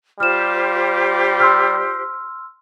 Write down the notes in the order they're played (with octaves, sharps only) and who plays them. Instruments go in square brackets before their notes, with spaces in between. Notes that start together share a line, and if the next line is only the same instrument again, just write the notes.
[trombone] G3 [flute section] F4 G4 C5 [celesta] F6 E7
[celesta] C6 E6 F6